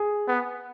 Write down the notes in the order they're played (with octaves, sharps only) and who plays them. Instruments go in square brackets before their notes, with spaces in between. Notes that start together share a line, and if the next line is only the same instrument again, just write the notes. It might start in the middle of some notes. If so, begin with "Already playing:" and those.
Already playing: [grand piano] G#4
[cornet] B3